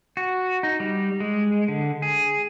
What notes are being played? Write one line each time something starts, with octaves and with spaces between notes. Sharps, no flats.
F#4
D#4
G3
G#3
D3
G#4